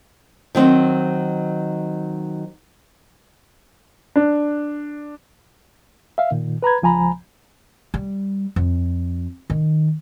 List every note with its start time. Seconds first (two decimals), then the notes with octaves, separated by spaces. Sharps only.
0.55 D#3 F#3 C4
4.16 D4
6.18 E5 F5
6.31 A#2 D#3
6.62 B4 A#5 B5 G#6
6.82 C#2 F3 G#5 A#5 B5
7.94 G3
8.56 F2
9.50 D#3